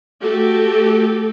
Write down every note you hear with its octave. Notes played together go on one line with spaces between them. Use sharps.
A3 F#4 G4 A4